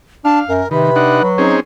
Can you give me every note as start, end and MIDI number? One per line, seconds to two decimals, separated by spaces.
0.25 0.41 62
0.25 0.53 77
0.25 0.39 81
0.49 0.63 42
0.49 0.71 70
0.71 1.22 48
0.71 0.91 51
0.71 1.43 71
0.71 1.28 83
0.96 1.23 62
0.96 1.23 63
0.96 1.23 78
1.22 1.54 54
1.38 1.60 60
1.38 1.60 61
1.38 1.57 63
1.38 1.60 68